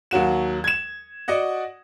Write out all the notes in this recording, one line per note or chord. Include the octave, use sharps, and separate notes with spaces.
D#2 F#3 F#4 E7
G#6 E7
F#4 D5 D#5 F#5